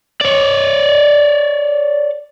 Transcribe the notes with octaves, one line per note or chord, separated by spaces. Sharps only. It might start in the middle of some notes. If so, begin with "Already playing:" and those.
C#5 D5